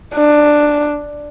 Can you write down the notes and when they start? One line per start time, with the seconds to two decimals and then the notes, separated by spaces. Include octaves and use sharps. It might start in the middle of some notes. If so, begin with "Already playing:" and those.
0.15 D4